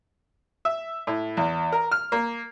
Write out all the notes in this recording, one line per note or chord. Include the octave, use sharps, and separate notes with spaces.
E5
A2
E2
A#4
F6
A#3